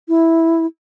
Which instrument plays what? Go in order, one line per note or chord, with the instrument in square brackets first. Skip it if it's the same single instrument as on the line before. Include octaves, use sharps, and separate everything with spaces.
[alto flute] E4